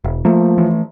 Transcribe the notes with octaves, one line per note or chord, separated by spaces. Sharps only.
E1
F3 A3 A#3
E3 A3